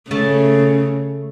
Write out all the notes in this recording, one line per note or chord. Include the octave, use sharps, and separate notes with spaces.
C#3 A3 A4